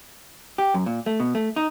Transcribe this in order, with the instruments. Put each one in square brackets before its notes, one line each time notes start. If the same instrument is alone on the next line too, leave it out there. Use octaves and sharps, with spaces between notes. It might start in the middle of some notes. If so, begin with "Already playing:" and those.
[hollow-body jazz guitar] G4
F#2
A#2
A3
B2
A3
D#4